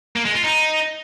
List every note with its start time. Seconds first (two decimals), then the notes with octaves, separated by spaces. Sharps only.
0.16 A#3
0.26 G#3
0.35 F4
0.44 D#4